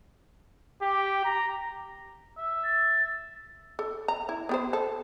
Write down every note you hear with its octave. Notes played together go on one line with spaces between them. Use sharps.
G4
A#5
E5
A6
A4
A#5
E4
B3 G4 C5
A4